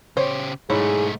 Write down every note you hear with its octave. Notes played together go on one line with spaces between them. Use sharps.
C#3 G4 C5 C#5
B1 G#2 A3 E4 G#4 C#5